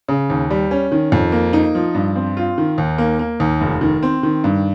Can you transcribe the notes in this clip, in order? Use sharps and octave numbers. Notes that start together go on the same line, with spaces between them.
C#3
D#2
G3
C#4
D#3
F2
A#3
D#4
F3
G2
C4
F4
D#3
D#2
A#3
A#3
D#2
F1
D#3
C4
D#3
G2